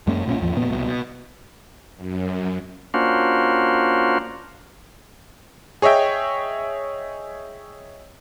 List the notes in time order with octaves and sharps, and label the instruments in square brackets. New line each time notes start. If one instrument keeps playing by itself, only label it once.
[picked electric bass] F#2 G#3 A#3 C#4
B1 A#2 C4 C#4
G#1 E2 F3
F1 A#2 B3
C2 B2
B2
[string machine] F#2
[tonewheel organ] A#3 C#4 D4 F4 F#4 C5
[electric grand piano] G#4 C#5 D#5 E5 G5